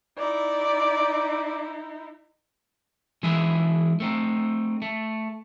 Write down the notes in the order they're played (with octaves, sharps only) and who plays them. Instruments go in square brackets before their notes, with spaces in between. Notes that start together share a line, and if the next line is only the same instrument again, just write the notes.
[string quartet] D#4 E4 [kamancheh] D5
[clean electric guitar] E3 G#3 D#4 E4 G#4 E5
A3 C4 D#4
A3